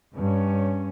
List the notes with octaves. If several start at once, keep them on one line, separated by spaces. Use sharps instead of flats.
G2 C#4